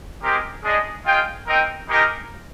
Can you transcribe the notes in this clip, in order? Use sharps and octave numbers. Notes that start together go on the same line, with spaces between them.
G#3 C4 G4 A#4
G#3 D4 G#4 D#5
F4 G#4 D#5 G5
C4 D#4 A#4 D#5 G5
G#3 D#4 G4 A#4 D#5